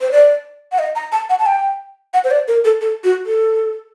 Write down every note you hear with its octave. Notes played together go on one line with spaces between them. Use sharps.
C5
D5
F#5
D#5
A#5
A5
F#5
A5
G5
F#5
C5
D5
A#4
A4
A4
F#4
A4